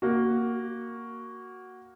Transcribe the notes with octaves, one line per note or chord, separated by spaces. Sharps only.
A#3 F#4